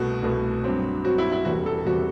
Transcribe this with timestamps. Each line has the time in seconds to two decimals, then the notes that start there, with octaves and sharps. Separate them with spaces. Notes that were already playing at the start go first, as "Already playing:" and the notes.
Already playing: C2 B2 A3 F#4
0.23 C2 B2 A3
0.64 G2 F#3 C4
1.04 G2 F#3 C4 F#4
1.18 E4
1.32 E4
1.45 E1 E2 C3 G3 F#4
1.66 A4
1.86 E2 C3 G3 F#4